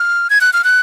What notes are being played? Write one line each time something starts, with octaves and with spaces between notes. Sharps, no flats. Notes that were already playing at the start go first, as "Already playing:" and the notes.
Already playing: F6
G#6
F#6
F6
F#6